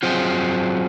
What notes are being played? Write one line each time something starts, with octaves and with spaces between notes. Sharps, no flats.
F#3 C4 F4 G#4 C5